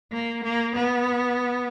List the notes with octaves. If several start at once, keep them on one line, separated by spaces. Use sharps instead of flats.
A#3
A#3
B3